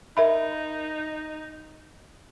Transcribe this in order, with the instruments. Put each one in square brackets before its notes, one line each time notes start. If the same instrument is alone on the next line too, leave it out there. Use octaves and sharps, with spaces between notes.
[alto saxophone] D#4 [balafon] A#4 E5 B5